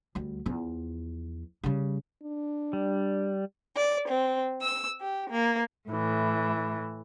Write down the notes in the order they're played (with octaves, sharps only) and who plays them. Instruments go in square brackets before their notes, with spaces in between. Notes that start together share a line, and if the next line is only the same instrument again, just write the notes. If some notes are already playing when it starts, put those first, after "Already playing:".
[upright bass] D2 G3
E2 F3
C#3 G3
[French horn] D4
[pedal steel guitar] G3
[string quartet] D5
C4
E6
G4
A#3
A2 E3